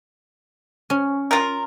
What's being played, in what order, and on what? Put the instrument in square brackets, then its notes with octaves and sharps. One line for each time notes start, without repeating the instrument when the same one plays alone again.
[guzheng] C#4
[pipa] F4 A#4